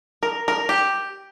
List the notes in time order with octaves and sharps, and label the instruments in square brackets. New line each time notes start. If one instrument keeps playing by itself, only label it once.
[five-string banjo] A#4
A#4
G4